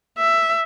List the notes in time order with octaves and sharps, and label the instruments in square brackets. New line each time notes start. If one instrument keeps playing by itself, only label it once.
[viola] E5